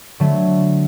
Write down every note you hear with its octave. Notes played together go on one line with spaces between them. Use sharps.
D3 F#3 A3